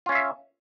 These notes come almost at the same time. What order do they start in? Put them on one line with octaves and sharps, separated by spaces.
F4 C#4 F5 E5